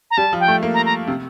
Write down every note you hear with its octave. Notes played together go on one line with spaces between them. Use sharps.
A#5
G3 A5
F3
G5
A3
A#3
A#5
A#5
C3